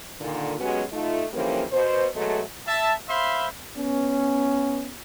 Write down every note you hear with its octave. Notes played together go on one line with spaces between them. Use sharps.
A#2 D3 D#3
F#3 G#3 B3 C#4 F#4 G4
A3 D#4 F4
D3 E3 F3 G3 A#3 C#4
B2 C5
B2 F#3 G#3 A3
E5 A5
C5 E5 F5 B5 C6
B3 C#4